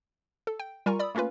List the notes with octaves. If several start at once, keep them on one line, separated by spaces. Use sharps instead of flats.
A4
G5
G3 F4 A#4 G#5 A#5 C#6
D5 B5 D#6 E6
A3 A#3 C#4 F4 B4